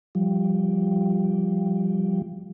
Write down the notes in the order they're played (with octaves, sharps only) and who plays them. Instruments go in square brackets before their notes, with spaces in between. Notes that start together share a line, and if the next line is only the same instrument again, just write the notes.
[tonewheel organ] F3 G3